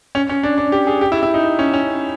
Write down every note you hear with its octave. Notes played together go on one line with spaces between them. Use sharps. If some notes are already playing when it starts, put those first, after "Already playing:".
C#4
C#4
D4
D4
G4
G#4
G4
E4
E4
D#4
C#4
C#4